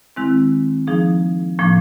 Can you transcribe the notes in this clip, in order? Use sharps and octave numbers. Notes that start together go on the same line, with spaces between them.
D#3 G#3 C4 E4
F3 A#3 D#4 G#4
A2 F3 A#3 D4